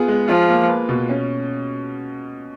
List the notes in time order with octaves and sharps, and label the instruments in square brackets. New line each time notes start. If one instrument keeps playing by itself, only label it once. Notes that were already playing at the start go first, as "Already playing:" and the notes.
Already playing: [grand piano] B3 F4 G#4
G#3
[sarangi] F3 [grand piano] F4
[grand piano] A#3
B4
B2
C#4